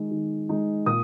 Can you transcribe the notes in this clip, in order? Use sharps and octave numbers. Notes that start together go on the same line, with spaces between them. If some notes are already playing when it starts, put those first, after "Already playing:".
Already playing: D#3 G#3 D#4
D#3
G#3 D#4
A#2 D#6